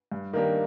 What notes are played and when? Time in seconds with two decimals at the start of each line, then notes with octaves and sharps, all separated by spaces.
0.12 G2
0.33 D#3 A#3 D4 G4